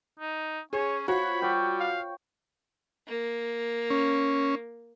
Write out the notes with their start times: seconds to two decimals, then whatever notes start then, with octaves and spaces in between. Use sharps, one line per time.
0.20 D#4
0.73 C#4 G#4 C#5
1.08 F4 F#4 C5 C#5 B5
1.42 G3 C#5 G5
1.79 F5
3.08 A#3
3.90 C#4